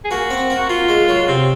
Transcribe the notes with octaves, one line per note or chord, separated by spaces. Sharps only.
G#4
A#3 F#4
C4
A#3
A#3 F4
G#3
F#3
C3 C4